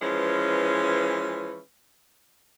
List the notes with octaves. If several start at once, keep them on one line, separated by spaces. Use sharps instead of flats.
E3 F3 G#3 C#4 B4